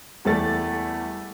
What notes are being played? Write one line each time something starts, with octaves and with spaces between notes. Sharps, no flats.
E2 G3 A3 A6